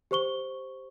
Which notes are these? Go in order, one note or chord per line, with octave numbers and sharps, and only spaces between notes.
G4 C5 C#6 G7